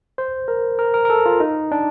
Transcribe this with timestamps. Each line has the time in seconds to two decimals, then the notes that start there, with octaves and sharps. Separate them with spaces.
0.18 C5
0.48 A#4
0.79 A#4
0.94 A#4
1.05 A#4
1.10 A4
1.26 F4
1.40 D#4
1.72 D4